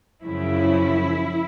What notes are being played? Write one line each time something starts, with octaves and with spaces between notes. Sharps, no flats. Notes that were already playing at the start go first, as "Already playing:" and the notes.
F#2 C#3 F3 E4